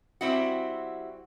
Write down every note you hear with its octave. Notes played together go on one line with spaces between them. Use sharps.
G3 C4 E4 F#4